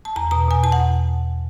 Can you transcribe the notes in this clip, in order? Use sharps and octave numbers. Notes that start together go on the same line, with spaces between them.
A5
E2 A#5
B2 A#5
B2 G#5
E2 A5
F#5